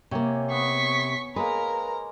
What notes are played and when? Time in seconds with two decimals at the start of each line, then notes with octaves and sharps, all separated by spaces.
0.11 C3 A#3 C#5 G#5 A#5
0.51 B3 C#6 B6
1.36 G#3 A#3 A#4 B4 A#5